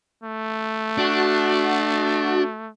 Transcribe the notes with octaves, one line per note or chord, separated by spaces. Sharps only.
A3
D4 F#4